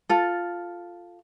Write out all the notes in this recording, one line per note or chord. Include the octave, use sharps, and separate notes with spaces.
F4 A4